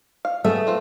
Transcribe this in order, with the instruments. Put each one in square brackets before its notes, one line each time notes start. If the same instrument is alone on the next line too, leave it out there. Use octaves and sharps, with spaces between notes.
[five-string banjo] F5
[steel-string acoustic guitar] A3 [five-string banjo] B3 G#4 E5
[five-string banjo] C4 F4 B4